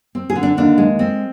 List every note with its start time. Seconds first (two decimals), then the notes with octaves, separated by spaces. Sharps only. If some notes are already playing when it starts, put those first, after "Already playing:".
0.15 C4
0.30 G#4
0.35 D3
0.43 D4
0.57 D#2 D4
0.78 G#3
0.99 C4